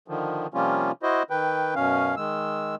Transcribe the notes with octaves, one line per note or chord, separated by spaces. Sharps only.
D3 D#3 F3
C3 F3 G3 A#3 C#4 F4
E4 F#4 C5 D#5
D#3 B4 G5
F#2 B2 C#4 F5
D#3 G#3 E6